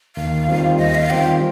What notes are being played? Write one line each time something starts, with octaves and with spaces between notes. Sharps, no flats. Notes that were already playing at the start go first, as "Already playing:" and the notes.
D#2 F5
D#3 G3 C4 F4
D#2 D#5
F5
D#3 G3 C4 F4 G5